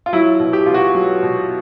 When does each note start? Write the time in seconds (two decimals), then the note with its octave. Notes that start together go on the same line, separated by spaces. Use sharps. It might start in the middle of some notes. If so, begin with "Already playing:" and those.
0.06 F4
0.13 F#3 E4
0.40 B2
0.53 G4
0.66 B2 F4
0.74 F#4
0.95 F#3
1.23 B2